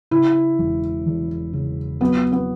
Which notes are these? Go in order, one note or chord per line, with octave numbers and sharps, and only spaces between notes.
C#3 E4
E1
E2
C#3
F#3 B3
B3